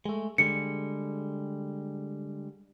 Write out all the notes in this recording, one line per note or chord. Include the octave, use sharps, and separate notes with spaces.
G#3 A3
D3 G3 G#3 C#7